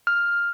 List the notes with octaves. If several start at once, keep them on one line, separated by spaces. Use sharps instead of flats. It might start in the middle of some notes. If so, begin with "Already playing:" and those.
F6